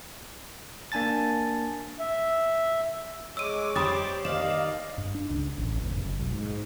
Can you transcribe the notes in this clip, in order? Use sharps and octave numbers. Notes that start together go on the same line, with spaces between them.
A#3 D4 G#5 A5 A6
E5
G#3 C#5 D6 E6 D#7
G4 C5 D5 B5 D6 D#6 A6
D#2 D5 D#5 F5 E7
G2
D4
C#2
A1
F1
F#1
B1
G#2